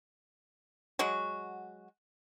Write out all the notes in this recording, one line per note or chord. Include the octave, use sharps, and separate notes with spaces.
F#3 G#3 F#4